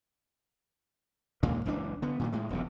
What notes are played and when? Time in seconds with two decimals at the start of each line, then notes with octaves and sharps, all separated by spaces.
1.43 D#2 A#2 G#3 A#3
1.66 F#1 C#2 E3 D4
2.02 D3 B3
2.19 A#2 D#3 F#3
2.32 A2 G#3
2.50 E1 B1 C3